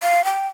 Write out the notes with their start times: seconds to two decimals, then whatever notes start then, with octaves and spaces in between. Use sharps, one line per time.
0.02 F5
0.24 G5